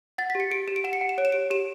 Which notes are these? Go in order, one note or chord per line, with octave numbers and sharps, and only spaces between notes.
F#5 A6
B6
G4 C#7
G4 D7
G4 E7
D7
F#5 E7
C#7
F#5
E7
C#5 D7
E7
G4 D7
G4 E7